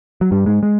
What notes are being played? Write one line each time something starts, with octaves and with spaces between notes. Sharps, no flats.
F#3
G2 G3
G#2 G#3
G#3